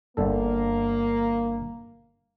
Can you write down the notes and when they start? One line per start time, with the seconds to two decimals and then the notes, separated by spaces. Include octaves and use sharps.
0.17 G1 D3 A#3 A4